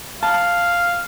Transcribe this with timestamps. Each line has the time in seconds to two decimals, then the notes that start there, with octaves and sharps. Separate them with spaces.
0.23 F5 A5